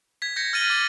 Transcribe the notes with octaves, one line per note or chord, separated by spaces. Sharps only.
G#6 B6
G6 A#6 B6 C#7
F6 A6 D#7 F#7 G7
D6